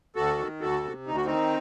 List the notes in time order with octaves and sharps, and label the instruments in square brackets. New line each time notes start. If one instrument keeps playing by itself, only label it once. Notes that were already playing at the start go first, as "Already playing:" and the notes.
[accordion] D2 F#4 A4
D#3
D2 F#4 A4
C3
D2 D#4
F#4
D#3 C4 D#4